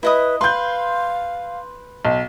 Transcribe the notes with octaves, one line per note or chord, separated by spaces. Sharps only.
E4 B4 D#5 D#6
B4 F5 C6 G6
B1